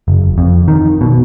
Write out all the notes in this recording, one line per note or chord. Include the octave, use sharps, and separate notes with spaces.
F#1
F2
D#3
B2